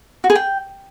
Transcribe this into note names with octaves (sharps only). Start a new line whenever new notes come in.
F#4
G#4
G5